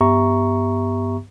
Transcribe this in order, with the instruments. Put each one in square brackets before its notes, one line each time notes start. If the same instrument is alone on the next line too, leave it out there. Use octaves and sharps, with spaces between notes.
[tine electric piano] G2 B3 G4 E5 A#5 C#6